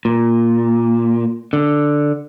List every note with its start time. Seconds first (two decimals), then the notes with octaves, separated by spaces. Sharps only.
0.05 A#2
1.53 D3